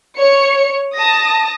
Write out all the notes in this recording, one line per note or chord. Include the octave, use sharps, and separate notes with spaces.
C#5 C#7
A5 D#6 A#6